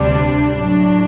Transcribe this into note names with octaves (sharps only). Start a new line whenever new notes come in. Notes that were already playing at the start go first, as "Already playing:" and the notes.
Already playing: D2 C3 G3 D4
A2 F#3 D4